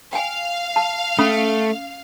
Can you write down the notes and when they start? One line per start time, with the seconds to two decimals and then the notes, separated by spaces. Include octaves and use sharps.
0.13 F5 G5 G#5
0.76 A5
1.19 A3 C#4 B5 D#6